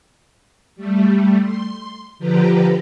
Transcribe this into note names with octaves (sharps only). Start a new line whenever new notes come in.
G3 A3
C6
D3 F3 G4 B4 A#5